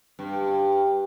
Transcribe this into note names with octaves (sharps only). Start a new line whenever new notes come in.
G2